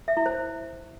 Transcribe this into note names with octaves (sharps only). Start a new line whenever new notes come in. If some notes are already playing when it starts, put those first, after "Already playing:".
E5
E4
C5